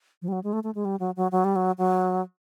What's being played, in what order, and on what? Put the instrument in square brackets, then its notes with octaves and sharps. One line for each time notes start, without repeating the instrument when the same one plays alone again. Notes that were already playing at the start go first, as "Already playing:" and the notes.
[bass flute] F3
G3
F#3
G#3
A3
A3
G#3
G3
F#3
F#3
F#3
G3
F#3
F#3